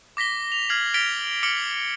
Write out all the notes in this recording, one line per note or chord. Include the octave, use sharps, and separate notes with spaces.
D6 A#6 B6 G7
F7
F6 G#6 C7 F#7
F6 A6 B6 D7 F7 G7
D6 F6 C#7 D7 F#7 G7